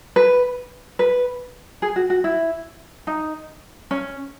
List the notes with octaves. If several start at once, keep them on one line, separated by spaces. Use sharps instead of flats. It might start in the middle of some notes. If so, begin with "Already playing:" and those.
B4
B4
G#4
F#4
F#4
E4
D#4
C#4